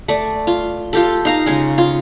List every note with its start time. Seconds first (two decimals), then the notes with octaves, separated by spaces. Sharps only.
0.08 A3 D5
0.47 F4
0.93 F4 G4 A4
1.25 D#4 F5 A#5
1.46 C#3 G#3 G#4
1.78 F4